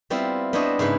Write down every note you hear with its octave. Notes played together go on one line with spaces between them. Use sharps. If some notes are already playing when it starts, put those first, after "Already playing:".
G3 B3 C4 E4 F4
B3 D4 E4 C5 C#5 D#5
G#2 C#3 E4 B4